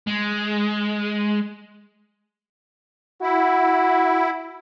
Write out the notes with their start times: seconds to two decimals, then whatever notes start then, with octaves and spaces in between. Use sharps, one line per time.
0.07 G#3
3.22 E4 F#4